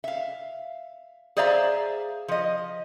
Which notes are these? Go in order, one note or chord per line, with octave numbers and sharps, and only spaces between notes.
E5 F5
G#4 C5 D5 E5 F5 A#5
F3 D#5